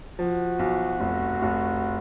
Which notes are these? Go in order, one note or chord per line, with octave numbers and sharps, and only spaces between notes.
F3 F#4
B1
F1
F1